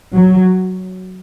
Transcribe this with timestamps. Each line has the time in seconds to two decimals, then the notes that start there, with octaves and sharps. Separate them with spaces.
0.14 F#3